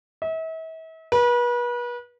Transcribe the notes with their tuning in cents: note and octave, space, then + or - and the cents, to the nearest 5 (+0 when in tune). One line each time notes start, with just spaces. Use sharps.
E5 -40
B4 -35